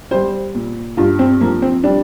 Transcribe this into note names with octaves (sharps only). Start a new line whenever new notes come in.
G3 C5
A#2
G2 F4
C4
F3 A#3
C4
G3 D4